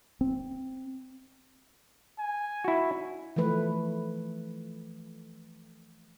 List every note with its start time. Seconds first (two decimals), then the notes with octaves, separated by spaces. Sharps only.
0.21 C4
2.19 G#5
2.64 E4 F#4
3.36 E3 F3 A3 B4